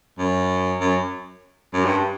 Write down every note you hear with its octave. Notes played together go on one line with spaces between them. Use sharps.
F#2
F#2
F#2
G2